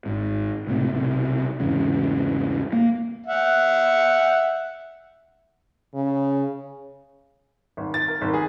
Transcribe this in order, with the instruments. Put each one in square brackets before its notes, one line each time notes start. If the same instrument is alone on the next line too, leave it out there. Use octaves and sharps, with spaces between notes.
[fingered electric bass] G#1 G#2
C#2 A2 C3
B1 C3
E2 G#2 C#3
A#3
[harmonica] E5 F#5
[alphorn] C#3
[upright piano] G#1
A6
A#4
G#1
G#4